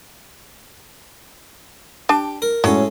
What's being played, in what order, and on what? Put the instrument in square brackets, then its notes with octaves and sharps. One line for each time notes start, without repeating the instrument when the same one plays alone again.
[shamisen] D4 A5 [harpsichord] G4
[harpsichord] A#4
[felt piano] A2 C#4 [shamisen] F#3 [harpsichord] G#3 A4 C#5